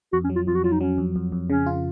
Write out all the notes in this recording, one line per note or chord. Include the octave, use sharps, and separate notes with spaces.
F2 F#4
C#4
F#3
F4
F2 F4
F#4
F#3 F4
D#4
F#3 C#4
F2
F2
F2
C#3 C#4
F4